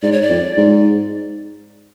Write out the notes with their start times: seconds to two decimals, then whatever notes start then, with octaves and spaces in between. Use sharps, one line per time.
0.02 G#2 D5
0.12 C#5
0.22 D5
0.30 F2
0.57 G#2